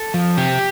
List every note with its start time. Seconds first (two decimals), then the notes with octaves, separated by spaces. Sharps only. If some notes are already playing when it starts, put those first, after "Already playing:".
Already playing: A4
0.14 F3
0.37 C3 G4